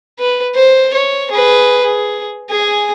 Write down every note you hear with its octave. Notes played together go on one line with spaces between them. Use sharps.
B4
C5
C#5
G#4 B4
G#4
G#4 G#5